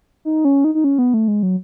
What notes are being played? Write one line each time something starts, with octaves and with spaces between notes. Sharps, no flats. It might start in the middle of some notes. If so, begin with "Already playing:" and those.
D#4
C#4
D#4
D#4
C#4
B3
A3
G#3
F#3